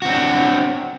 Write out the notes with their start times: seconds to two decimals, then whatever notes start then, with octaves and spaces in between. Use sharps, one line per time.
0.02 F#4
0.05 C4
0.09 D4